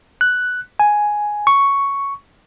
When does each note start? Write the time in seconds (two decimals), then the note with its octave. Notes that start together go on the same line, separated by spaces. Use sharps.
0.21 F#6
0.80 G#5
1.47 C#6